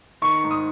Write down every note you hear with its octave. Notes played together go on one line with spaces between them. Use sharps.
D#3 C#6
G#2
D#6